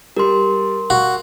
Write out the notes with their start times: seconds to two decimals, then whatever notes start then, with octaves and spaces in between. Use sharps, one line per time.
0.17 G3 G4 A#4 C6
0.90 F#4 F5